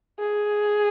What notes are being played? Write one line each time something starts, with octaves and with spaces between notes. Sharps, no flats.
G#4